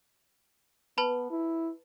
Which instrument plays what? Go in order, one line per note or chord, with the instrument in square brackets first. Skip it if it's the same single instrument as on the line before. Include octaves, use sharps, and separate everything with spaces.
[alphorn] B3 [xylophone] B4 A5 B5
[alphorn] E4